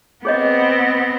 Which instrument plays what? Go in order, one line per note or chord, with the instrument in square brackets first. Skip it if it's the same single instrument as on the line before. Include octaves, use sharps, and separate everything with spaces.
[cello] B3 C4 [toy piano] G#4 C#5 D#5